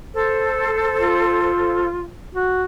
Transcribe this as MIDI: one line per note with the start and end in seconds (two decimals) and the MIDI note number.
0.15 1.85 69
0.15 1.85 72
1.00 2.11 65
2.35 2.64 66